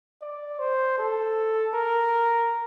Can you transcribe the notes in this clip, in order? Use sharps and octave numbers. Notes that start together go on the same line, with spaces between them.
D5
C5
A4
A#4